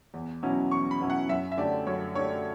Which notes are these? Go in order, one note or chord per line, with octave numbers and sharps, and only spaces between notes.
E2
B2 F#3 C#4 E4
E2 C#6
B5
B2 F#3 C#4 E4
F#5
F#2 E5
E5
D3 A3 D4 G4 D5
F#2 C#5
D3 A3 D4 G4 C#5